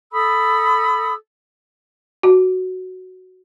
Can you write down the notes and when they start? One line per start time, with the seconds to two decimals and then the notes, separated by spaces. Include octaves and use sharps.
0.12 A4 B5 D#6 E6
2.23 F#4